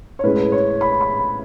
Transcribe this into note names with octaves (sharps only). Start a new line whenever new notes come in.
C#5
A2 G#3 C#4 B4
C#5
B5
B5